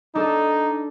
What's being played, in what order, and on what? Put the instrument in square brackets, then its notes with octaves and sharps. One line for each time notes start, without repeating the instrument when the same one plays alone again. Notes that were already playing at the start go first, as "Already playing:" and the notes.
[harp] D4 A4 [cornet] D#4